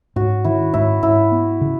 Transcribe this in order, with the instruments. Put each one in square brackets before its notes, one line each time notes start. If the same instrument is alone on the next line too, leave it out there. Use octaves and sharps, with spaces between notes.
[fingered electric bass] G#2 [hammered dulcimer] F#4
[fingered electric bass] D#3 [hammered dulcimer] E4
[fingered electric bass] G#2 [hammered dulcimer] E4
[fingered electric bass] G#2 [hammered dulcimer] E4
[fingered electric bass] B3
C#3